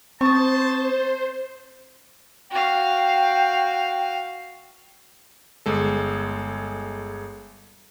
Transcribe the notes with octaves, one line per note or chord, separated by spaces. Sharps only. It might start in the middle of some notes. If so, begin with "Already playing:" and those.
C4 C5 A5 C#6 D#6
F#4 F5 G5
G1 G#3 A4